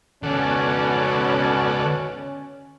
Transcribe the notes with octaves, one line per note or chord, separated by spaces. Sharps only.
C#2 B2 D#3 C#4 A4 D5 F#5